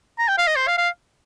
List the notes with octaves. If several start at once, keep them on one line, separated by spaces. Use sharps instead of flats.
A#5
G5
F5
D#5
C5
F5
F5